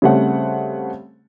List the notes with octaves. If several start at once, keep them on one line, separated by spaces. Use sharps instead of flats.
C#3 G3 A3 C4 F#5